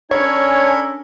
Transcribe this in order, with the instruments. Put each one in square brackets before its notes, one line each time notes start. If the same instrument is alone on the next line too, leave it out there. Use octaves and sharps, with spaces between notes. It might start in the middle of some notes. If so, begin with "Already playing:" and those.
[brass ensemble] C#4 D4 [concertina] A4 A#4 B5 [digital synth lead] C#5 [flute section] G#5 G#6